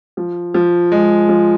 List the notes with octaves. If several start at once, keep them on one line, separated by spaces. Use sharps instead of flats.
F3
F3
G#3
F3